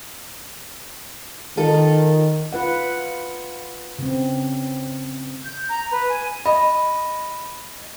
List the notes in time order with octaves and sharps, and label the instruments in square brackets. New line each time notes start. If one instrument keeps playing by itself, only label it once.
[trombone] D#3 [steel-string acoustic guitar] F4 A4
[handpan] F4 B4 F#5
C#3 C4
[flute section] G6
A#5
B4
G#5
[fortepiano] D#5 [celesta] B5